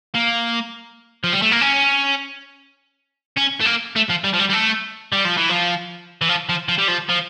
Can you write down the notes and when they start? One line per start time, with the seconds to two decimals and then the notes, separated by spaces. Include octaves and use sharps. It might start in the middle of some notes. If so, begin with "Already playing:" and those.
0.14 A#3
1.24 F3
1.33 G3
1.42 A3
1.52 A#3
1.61 C#4
3.37 C#4
3.60 A3
3.65 A#3
3.96 A3
4.10 F3
4.24 G3
4.34 F3
4.40 G3
4.50 G3
4.53 A3
5.13 G3
5.25 F3
5.37 E3
5.49 F3
6.22 E3
6.29 F3
6.49 F3
6.68 F3
6.78 G3
6.88 F3
7.09 F3